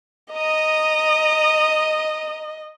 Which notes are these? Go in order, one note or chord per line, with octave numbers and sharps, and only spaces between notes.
D#5 A#5 D#6